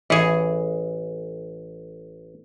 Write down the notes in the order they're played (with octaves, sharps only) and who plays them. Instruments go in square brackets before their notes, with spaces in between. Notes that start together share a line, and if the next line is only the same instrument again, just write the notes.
[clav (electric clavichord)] A1 [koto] E3 G#4